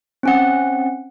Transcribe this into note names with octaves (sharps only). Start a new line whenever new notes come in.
C4 C#4 F#5